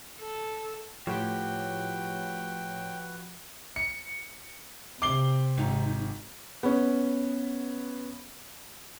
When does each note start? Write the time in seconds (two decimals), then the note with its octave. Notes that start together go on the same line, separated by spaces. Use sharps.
0.20 A4
1.07 A2 F3 F#4 G4 B4 C#5 G5
3.76 C#7
5.02 C3 D6 C7 G7
5.58 G#1 D#4
6.63 B3 C#4